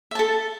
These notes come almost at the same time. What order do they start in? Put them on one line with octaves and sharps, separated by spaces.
E5 A5 A4